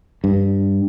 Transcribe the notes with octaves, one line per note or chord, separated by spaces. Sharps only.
G2